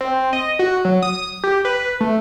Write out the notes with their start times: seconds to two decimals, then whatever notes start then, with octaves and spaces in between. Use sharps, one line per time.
0.01 C4
0.33 D#5
0.59 F#4
0.85 F#3
1.03 D#6
1.44 G4
1.65 B4
2.00 A3